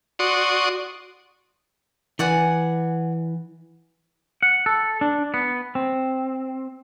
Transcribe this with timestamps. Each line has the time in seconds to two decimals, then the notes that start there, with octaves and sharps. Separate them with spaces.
0.19 F#4 D5 C6 C#6 D#6
2.19 E3 D5 F#5 G#5
4.43 F#5
4.66 A4
5.01 D4
5.34 B3
5.75 C4